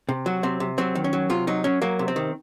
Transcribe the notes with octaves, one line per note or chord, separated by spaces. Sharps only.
C3
F#3 F#4
C3 C4
C3
F#3 C4
D#3
C#4
F#3
C3 F4
F#3 D#4
F#3 C#4
F#3 A#3
C3
C4
D#3